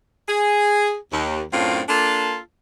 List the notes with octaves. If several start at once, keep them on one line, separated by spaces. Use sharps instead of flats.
G#4
D#2
F#2 A2 C4 D4 F4
A#3 D4 F4 A4